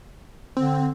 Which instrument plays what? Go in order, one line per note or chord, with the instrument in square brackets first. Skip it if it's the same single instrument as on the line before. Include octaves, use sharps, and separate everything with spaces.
[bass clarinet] D3 [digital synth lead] C4